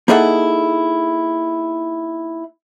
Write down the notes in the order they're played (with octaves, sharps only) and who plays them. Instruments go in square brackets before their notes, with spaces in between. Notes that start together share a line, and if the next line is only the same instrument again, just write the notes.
[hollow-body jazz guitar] A#3 D#4 E4 G#4 A4 F#5